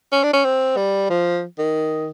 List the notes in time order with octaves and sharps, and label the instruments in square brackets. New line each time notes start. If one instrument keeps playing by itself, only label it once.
[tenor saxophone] C#4
D4
C#4
C4
G3
F3
D#3